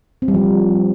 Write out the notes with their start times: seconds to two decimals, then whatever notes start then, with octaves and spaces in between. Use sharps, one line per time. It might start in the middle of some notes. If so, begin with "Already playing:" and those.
0.22 C4
0.28 G3
0.34 F3